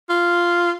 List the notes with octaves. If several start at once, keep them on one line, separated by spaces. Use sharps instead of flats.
F4